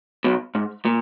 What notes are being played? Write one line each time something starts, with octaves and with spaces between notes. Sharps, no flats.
B1 B2
G#2
A#2